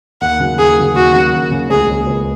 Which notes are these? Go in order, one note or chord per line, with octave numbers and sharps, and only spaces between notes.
D#2 F#5
C#3 F#3
D#2 G#4
C#3 F#3
D#2 F#4
C#3 F#3
D#2
C#3 F#3
C#2 G#4
C#3 A#3 C#4
C#2